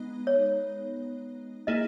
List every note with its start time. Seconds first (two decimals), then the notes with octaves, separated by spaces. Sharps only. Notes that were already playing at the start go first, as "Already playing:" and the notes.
Already playing: G#3 B3 D#4
0.27 C#5
1.67 A#3 E4 G#4 D#5